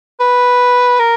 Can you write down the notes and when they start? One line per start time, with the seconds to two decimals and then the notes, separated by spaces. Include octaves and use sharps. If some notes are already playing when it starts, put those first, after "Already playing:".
0.20 B4
0.99 A#4